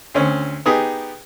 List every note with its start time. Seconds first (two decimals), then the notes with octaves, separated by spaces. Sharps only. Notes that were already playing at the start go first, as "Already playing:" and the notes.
0.14 D2 C4 C#4
0.66 B3 D#4 G4 G#4